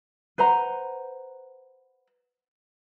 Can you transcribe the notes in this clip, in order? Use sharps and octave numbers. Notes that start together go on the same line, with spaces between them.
B4 C5 F#5 A#5